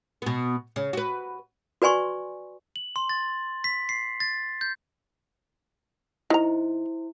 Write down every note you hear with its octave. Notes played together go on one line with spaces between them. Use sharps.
B2 B3
C#3
F#4 B4
F#4 B4 D5 G#5 C6 C#6
F#7
C6
A6
B6
C7
A6
G6
D#3 E4 C5 A#5